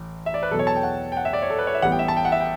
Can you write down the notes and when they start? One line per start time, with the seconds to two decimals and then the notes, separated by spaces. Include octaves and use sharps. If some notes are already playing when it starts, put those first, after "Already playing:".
Already playing: A1
0.26 E5
0.34 D5
0.42 B4
0.51 E2 B2 F#3 A4
0.59 C#5
0.67 A5
0.76 G5
0.83 F#5
1.12 G5
1.17 F#5
1.25 E5
1.33 D5
1.42 C#5
1.50 A4
1.58 B4
1.67 C#5
1.74 E5
1.82 A1 A2 G3 B3 F#5
1.92 G5
1.99 E5
2.08 A5
2.17 G5
2.25 F#5
2.32 E5
2.40 G5